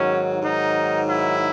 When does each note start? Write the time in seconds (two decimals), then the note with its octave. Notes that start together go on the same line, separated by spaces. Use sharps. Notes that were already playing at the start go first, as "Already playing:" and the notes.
Already playing: G#2 D#3 F#3 C#4
0.42 G#2 D#3 F#3 D#4
1.09 E4